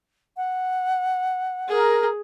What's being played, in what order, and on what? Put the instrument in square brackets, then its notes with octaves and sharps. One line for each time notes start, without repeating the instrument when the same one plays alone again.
[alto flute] F#5
[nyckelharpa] G#4 [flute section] A#4